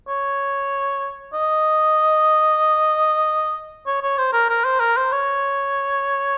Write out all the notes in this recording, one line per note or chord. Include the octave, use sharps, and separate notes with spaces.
C#5
D#5
C#5
C#5
C5
A#4
A#4
C5
A#4
C5
C#5